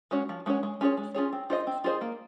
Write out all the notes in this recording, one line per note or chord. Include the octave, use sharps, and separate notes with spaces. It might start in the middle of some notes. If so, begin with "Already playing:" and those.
G#3 C#4 F#4 C#5
F3
G#3 C#4 F#4 C#5
G#3
C#4 F4 G#4 C#5
G#3
C#4 F4 G#4 C#5
C4
F4 G#4 C5 D#5
C4
F4 G#4 C5 D#5
A#3